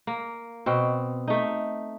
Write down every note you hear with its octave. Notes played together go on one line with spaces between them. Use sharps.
A#3
B2 C4
A3 D#4